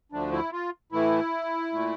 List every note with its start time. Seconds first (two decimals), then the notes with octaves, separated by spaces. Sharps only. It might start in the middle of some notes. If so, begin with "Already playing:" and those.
0.12 D2 D3 F3 A3 D4
0.32 E4
0.52 F4
0.92 A2 E3 A3 E4
1.72 A#2 A3